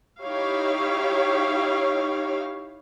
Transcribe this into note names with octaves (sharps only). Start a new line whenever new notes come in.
D#4 E4 G4 C#5 F5